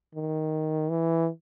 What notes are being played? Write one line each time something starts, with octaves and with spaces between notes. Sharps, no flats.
D#3
E3